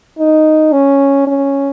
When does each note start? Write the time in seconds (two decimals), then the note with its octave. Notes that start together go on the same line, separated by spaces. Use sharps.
0.18 D#4
0.72 C#4
1.27 C#4